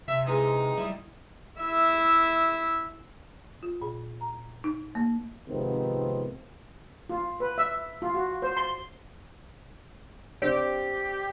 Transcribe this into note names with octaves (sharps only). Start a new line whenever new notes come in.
C3 E5
E3 G#3 D#4
G3 E4
E4 E5
F4
A#2
A#5
D#4
A#3
G#2 C3 D#3 F3 B3 C4
F4
B4
E5
F4
F#4
C5
C6
C4 D4 G4